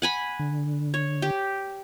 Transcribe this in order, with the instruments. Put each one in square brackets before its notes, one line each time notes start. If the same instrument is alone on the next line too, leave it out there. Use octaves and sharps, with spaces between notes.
[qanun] F#5 G#5 B5
[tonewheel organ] D3
[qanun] C#5
G4